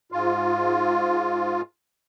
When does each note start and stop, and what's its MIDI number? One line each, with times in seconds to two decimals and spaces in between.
0.12 1.61 44
0.12 1.61 65